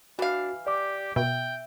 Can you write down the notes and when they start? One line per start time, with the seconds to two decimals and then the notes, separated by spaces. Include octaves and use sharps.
0.19 E3 D4 F#4 F5
0.67 G4 D5 D6
1.16 B2 E5 G5